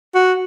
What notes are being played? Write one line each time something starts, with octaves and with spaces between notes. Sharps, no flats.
F#4